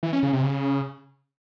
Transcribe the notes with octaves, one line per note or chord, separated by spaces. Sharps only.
E3
C#4
C#3
C3
C#3